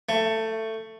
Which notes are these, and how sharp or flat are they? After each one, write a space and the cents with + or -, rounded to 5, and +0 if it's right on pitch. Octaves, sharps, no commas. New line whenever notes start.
A3 +15